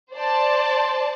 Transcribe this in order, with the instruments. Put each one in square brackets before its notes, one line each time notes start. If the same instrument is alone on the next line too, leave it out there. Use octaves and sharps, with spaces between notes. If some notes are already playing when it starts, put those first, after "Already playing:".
[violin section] C5 D5 A5